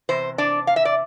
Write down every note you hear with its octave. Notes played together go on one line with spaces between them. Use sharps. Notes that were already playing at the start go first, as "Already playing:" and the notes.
E2 C3 C5
D4 D5
F5
E5
D5